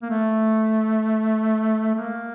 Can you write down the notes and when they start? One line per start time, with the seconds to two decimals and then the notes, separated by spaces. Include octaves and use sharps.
0.02 A#3
0.10 A3
1.95 A3
2.00 A#3